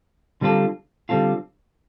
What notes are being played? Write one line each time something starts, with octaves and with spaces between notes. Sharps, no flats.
D3 G3 C4 F4 A4
D3 G3 C4 F4 A4